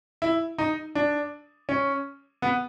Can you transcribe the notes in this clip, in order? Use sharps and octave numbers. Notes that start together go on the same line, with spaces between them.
E4
D#4
D4
C#4
B3